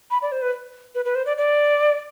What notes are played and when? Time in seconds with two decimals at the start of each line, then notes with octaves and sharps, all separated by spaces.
0.11 B5
0.22 D5
0.32 C5
0.42 B4
0.95 B4
1.05 B4
1.15 C5
1.26 D5
1.37 D5